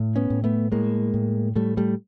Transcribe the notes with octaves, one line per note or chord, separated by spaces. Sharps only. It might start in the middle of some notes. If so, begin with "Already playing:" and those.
Already playing: A2
B3 C#4
A2
A3 B3
A2 G#3 A#3
A2
A2 G3 A3
G3 A3